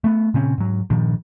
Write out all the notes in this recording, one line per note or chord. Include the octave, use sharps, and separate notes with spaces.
A3 B3
A#2 C#3 C4 C#4
G#2 F#3
G2 A#2 D#3 F3